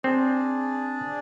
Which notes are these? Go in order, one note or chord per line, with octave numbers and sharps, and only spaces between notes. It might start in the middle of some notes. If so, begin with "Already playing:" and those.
C4 D4 G#4 D5